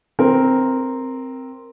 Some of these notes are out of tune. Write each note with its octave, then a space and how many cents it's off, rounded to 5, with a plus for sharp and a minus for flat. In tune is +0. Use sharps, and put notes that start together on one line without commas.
C4 +0 A#4 +0